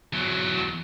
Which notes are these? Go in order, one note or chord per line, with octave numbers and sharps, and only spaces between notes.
E2 F#3